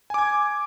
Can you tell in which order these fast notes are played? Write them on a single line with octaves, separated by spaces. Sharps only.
G#5 D6 G#6